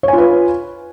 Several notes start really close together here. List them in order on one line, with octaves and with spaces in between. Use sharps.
C#5 G#5 F4 B4